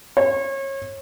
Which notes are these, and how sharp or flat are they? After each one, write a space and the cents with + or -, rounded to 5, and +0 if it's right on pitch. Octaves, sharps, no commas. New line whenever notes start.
C#5 -30